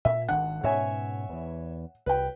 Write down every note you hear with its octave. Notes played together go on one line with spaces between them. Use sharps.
A#2 E5
G#1 D#3 D4 F#5
G#2 B2 C#4 C#5 E5 G#5
E2 E3
C2 B4 G5